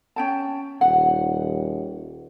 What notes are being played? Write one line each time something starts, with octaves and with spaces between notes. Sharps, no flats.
C#4 G5 A5
D#1 F#5